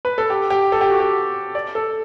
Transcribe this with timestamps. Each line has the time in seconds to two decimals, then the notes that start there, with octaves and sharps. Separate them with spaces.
0.05 B4
0.18 A4
0.30 G4
0.50 G4
0.72 A4
0.81 G4
0.90 F#4
1.00 G4
1.55 D5
1.75 A4